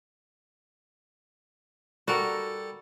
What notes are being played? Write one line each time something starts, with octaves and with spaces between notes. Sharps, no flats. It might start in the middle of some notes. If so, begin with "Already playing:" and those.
G3 F#4 A4 A#4